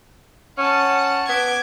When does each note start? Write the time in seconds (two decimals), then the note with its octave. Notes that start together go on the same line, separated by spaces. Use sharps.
0.58 C#4 F#5 A5
1.29 B3 D6 G#6